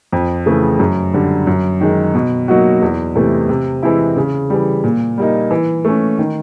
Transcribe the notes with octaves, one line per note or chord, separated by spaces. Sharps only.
F2
C#3 E3 A3
F#2
D3 G3
F#2
D#3 G#3
B2
F#3 A#3 D#4 F#4
E2
C3 E3 A3
C3
E3 G#3 C4 E4
C#3
E3 G3
A#2
G3 A#3 D#4
E3
A3 C#4
D#3